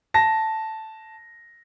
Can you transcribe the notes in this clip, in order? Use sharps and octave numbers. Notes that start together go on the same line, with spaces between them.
A5 A#6